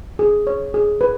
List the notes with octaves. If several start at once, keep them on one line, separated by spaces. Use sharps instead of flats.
G#4
C#5
G#4
B4